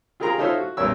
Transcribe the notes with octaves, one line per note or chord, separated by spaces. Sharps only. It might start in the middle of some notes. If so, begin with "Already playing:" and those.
F4 G4 G#4 A#4 A#5 C6
D#4 F4 A4 C5 C#5 E5
F#4
B1 F#2 G3 A#4 C#5 E6